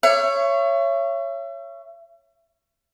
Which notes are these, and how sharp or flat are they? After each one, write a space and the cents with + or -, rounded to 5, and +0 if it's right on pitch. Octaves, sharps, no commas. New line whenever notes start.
C#5 +0 E5 +40